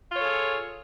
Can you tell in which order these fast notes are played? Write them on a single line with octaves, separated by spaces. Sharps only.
F4 C#5 A4 G#4